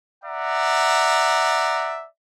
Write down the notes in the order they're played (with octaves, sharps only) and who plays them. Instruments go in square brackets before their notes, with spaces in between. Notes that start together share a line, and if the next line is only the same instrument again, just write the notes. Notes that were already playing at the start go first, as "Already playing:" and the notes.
[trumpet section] D5 E5 F#5 A#5